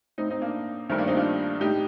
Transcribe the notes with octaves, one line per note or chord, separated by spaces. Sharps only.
A2 C4 D#4
C4 D#4
A#3 D4
G2 D#3 A3 C4
A#3 D4
C4 D#4
D4 F4
A2 D#4 G4